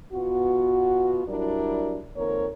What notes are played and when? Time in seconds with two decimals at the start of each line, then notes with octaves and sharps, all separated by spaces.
0.13 B2 B3 F4 F#4
1.27 F#3 G3 D4 E4 A#4 D5
2.17 F2 D#3 A#3 C4 A#4 C#5